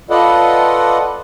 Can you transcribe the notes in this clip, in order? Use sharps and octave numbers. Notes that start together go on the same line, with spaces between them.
F4 A4 B4 D5 D#5 F#5